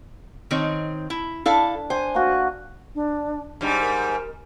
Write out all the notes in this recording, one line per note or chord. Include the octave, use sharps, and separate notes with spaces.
D#3 C4 C#5
E4
D4 E4 A4 F5
C5 G#5
A#3 F#4
D4
G#2 G3 D4
A#4